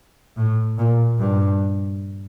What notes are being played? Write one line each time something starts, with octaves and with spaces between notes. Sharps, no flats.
A2
A#2
G2